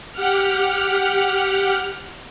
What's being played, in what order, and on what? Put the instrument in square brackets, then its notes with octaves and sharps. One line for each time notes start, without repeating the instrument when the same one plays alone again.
[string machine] G4 F#5 F6